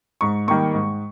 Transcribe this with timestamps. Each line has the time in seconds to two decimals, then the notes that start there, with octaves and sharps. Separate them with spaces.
0.21 G#2 C#6
0.48 D#3 G3 A#3 C#6
0.74 G#2